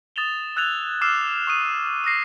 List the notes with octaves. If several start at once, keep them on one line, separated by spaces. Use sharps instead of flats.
D#6 A6 E7 F7 G7
E6 F#6 G#6 A6 F7
D6 E6 F6 C7 E7
C#6 D#6 D#7
D#6 F6 A#6 C7